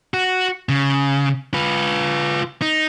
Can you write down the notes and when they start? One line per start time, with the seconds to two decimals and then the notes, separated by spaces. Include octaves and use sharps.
0.14 F#4
0.69 C#3
1.54 F4 B4
2.62 D#4